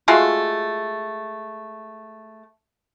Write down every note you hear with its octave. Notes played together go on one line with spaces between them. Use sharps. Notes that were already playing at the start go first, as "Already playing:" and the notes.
G#3 A3 F4 F#4